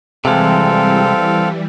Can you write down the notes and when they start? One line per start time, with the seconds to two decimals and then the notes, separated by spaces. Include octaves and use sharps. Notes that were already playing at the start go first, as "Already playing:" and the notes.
0.25 C3 E3 G3 G#3 C4 A4 F5